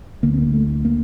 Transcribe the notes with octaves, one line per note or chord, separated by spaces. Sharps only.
D2 D3 A#3
C4
A#3
A3
A#3